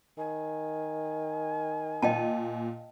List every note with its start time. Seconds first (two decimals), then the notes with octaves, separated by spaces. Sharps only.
0.18 D#3 G#5
2.02 A#2 D#5 G5 A5